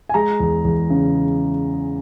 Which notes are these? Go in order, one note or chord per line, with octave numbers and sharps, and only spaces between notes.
G#5
G#3 A#5
E2
E2
C#3